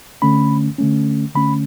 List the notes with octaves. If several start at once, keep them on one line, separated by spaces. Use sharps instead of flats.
D3 A3 C#4 B5
D3 A3 C#4
D3 A3 C#4 B5